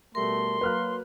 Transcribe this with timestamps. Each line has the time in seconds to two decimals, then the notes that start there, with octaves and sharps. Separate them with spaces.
0.15 B2 G3 A3 A#4 C6
0.61 F#3 A#3 B4 F6 F#6